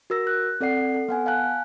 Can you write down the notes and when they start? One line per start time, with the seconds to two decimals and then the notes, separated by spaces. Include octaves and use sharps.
0.10 F#4 A#4 E6 A#6
0.27 F#6
0.60 C4 A4 D5 F#5 C7
0.94 A4
1.08 B3 F#5 G#5
1.26 F5 G#5 A5 F#6